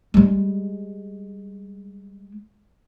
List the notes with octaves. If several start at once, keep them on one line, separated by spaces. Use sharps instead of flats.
G3 G#3